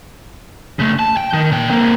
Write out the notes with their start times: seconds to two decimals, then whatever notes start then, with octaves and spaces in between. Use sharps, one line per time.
0.79 C#3 A3
0.99 A5
1.17 G5
1.34 D#3
1.52 A#2 G5
1.70 A#3 C4